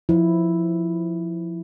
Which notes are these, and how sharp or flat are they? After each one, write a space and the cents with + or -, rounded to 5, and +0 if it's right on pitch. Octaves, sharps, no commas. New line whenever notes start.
F3 +0 E4 +0